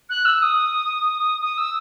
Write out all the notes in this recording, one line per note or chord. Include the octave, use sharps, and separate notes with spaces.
F#6
E6
D#6
D#6
E6